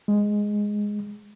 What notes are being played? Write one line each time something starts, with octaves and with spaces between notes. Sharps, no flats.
G#3